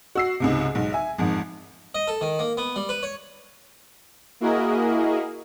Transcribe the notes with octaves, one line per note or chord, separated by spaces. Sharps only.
F#4 E6 C7
C#2 G#2 C3
B1 G#2
E5 G#5
G#1 F2 G#2
D#5
A4
D#3
A#3
B3
G3
B4
C#5
A#3 E4 F#4 G#4 A#4 D#5